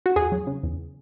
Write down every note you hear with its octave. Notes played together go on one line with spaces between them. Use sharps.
F#4
E2 G#4
F#3
C#3
E2